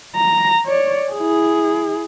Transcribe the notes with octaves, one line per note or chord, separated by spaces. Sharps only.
A#5
C#5 D5
E4 G#4